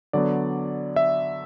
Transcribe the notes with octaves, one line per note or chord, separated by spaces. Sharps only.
D3 F#3 B3 D5
E5